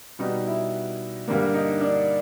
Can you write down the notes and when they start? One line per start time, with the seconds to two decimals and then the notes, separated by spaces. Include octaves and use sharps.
0.19 B2 G3 B3 D#4
0.47 E4
1.28 G2 D3 G3 A#3
1.54 D#4
1.81 D4